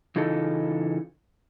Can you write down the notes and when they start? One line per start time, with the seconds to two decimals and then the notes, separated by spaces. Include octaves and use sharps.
0.16 C#3 E3 D#4 F4 A4